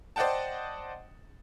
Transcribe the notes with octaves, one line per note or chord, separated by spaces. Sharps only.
C5 D5 D#5 F#5 G5 A5